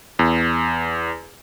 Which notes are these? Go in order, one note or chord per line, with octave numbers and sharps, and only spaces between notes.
E2